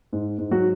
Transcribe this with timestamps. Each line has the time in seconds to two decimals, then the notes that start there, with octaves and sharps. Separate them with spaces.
0.13 G#2
0.38 G#2
0.51 F#3 F#4